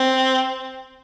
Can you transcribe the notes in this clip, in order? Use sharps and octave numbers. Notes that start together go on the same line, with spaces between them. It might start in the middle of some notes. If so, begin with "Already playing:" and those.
Already playing: C4